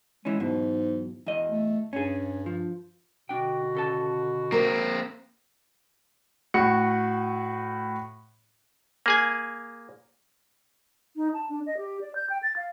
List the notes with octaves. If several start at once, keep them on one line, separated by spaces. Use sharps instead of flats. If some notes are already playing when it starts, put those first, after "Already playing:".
E3 G#3 C#4
B1 E2 G#2 B2
E2 D#5
A3
G2 C#4 G#4
F3
B2 D3 D4 F#4 G5
C#3 A4 A5
A#3 C4 A#4
A2 F#4 C#7
A#3 G#4 G#5
D#4
A5
D4
D#5
G4
D5
G6
G5
A6
F5